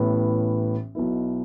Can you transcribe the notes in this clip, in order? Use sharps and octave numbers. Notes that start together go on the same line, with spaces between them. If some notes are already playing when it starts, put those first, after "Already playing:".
Already playing: A1 A2 E3 B3
B1 B2 B3 E4